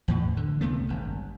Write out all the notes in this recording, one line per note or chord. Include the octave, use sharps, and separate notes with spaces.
E2 A2
D3
C#2 C3 A3 B3
G#1 G2